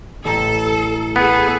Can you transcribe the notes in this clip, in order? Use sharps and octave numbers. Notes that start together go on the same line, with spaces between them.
A1 A4 A#5
B3 G#4 A4